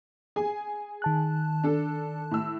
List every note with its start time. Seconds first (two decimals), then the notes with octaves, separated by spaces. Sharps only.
0.36 G#4 G#5
1.02 D#3 A5 F#6
1.64 D4 A4
2.31 A2 E6